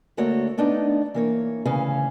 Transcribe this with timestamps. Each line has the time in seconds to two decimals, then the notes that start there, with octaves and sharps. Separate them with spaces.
0.17 D3 A3 A#3 F#4 A4 C#5
0.58 A3 B3 D4 D#4 D5
1.14 E3 A#3 C#5
1.65 D2 C#3 E3 C#4 F5